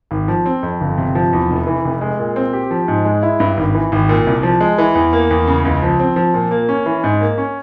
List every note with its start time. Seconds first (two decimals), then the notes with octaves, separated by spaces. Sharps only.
0.11 G#1
0.28 F3
0.46 C4
0.63 F2
0.81 G1
0.98 C3
1.15 F3
1.33 E2
1.50 F1
1.67 E3
1.85 F1
2.01 G#3
2.19 A#2
2.36 C4
2.53 G4
2.71 F3
2.88 G#2
3.05 G#3
3.23 E4
3.40 G2
3.57 G#1
3.75 E3
3.92 G#1
4.09 A#2
4.27 C2
4.43 F3
4.61 G#3
4.78 E3
4.95 E2
5.13 A#3
5.31 E2
5.47 C#3
5.65 C#2
5.82 F3
6.00 C4
6.16 F3
6.34 A#2
6.51 A#3
6.69 C#4
6.86 E3
7.04 G#2
7.21 A#3
7.38 C#4